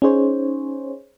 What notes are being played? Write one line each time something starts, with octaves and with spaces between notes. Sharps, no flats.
C#4 D#4 G#4 C5 C#5